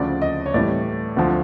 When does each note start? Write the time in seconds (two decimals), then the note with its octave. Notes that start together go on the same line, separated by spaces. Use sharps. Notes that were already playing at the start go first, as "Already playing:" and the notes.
Already playing: D2 C#3 F3 D5
0.22 D#5
0.46 C#5
0.54 A2 E3 G3 D5
1.17 D2 D3 F3